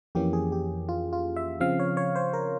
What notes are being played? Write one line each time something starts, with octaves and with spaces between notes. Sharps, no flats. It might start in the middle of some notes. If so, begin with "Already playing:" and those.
F2 E3 A#3 C#4 G4
G#4
G4
F4
F4
E5
C#3 F3 C4 F5
C#5
C#5
C5
A#4